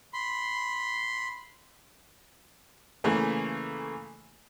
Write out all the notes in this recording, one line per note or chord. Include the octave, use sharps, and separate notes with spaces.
B5 C6
C#3 E3 A3 A#3